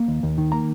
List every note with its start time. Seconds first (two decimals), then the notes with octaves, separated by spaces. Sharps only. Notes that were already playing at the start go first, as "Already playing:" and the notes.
Already playing: A#3
0.08 D#2
0.23 D#2
0.38 D#3
0.52 A#3 A#5